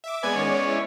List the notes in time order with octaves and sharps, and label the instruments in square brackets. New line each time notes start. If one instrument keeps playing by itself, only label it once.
[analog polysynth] E5 D6
[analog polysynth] G#3 B3 D5 [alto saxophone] B4 [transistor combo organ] G#5
[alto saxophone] D#3 [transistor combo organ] C#4
[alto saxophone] C#5
E4